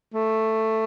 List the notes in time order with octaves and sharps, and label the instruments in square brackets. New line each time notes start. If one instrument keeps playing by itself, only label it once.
[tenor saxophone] A3